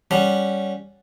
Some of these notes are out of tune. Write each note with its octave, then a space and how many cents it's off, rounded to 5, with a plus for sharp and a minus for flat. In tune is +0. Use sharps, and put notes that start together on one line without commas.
G3 +0 C#4 +0 F#5 +0